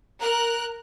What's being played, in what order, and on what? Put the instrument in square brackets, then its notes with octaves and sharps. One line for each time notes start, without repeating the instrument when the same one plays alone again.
[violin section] A#4 F#6 [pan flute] A#5